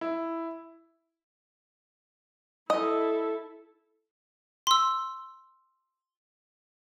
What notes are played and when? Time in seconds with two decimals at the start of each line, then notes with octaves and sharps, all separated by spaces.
0.01 E4
2.70 E4 A4 D#5
4.67 C6 E6